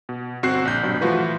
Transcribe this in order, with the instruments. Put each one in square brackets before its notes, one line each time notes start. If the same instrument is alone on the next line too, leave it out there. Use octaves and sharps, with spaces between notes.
[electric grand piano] B2
G1 C4 F#4 C5 F#6 C7
A#1 G6
A#1 G2 B2 F#3
E3 F3 A3 F4 F#4 B4